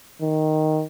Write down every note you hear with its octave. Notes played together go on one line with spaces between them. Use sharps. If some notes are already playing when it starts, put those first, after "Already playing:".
D#3